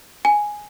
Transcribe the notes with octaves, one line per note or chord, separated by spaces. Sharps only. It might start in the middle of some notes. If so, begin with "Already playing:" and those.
G#5